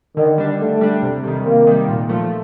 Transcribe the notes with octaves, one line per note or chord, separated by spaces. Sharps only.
D3 D#3
G3 D4
D3 A3
G3 D4
C3
D#3 G3
C3 A#3
D#3 G3
A#2
F3 A3